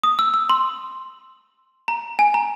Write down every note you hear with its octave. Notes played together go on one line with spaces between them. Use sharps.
D#6
E6
E6
C6
A#5
G#5
A#5